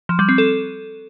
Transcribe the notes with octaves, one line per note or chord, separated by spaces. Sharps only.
F3
G3
C4
A4